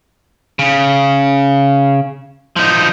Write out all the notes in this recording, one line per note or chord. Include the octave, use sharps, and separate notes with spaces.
C#3
F3 D#4